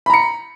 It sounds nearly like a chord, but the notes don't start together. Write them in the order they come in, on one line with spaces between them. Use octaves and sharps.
B5 A#5 C#7